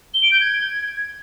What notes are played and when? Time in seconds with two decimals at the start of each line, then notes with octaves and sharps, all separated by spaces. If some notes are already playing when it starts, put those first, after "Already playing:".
0.14 G7
0.23 D7
0.32 G6
0.41 G#6